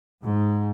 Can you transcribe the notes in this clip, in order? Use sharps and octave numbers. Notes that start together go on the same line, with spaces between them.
G#2